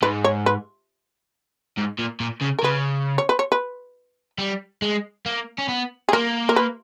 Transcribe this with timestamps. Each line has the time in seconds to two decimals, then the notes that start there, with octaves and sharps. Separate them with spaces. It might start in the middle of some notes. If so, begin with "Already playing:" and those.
0.02 G#2 B4
0.24 C#5
0.46 B4
1.77 G#2
1.99 A#2
2.20 A#2
2.42 C#3
2.59 A#4
2.63 C#3 B4
3.18 C#5
3.29 B4
3.39 C#5
3.52 B4
4.38 G3
4.82 G#3
5.26 A#3
5.58 C#4
5.69 B3
6.09 G#4
6.13 A#3 A#4
6.49 A#4
6.56 B4